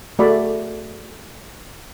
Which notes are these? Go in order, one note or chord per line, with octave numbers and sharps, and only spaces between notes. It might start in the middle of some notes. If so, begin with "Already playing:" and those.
A3 F#4 G#4 D5 B5